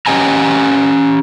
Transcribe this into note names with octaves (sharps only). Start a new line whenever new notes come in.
C#4 G4 D#5 F#5 G#5 A#5